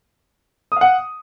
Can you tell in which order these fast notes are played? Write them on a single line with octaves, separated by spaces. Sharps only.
D#6 F5 F#5